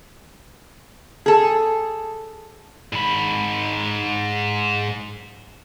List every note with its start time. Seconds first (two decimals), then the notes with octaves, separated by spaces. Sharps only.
1.26 G#4 A4
2.93 G#2 B5